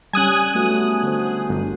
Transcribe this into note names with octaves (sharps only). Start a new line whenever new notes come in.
G3 C#4 G#5 D#6 F#6
A3 B3 F#4
D3 C5
G1